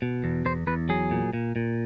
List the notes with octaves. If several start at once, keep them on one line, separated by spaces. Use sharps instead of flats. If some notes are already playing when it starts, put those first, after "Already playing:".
B2
E2
E2 C5
E2 B4
F#3 G#4
A#2
A#2
A#2